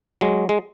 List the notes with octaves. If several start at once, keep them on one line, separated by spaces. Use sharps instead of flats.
F#3 G#3
G#3